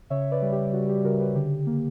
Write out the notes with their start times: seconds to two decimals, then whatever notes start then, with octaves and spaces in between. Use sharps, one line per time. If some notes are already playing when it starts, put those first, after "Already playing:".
0.10 C#3 C#5 E5
0.31 B4 D5
0.42 G3
0.52 G4
0.73 C#3 F#4
0.89 G4
1.04 C#3 F#4 A#4
1.20 G4 B4
1.35 D3 G4
1.67 A#3